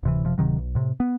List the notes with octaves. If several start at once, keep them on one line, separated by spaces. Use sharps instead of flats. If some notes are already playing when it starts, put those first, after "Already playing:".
D1 C3 E3
F#1 C3 F3
D1 C3 D#3 F#3
B1
A2 C3
B3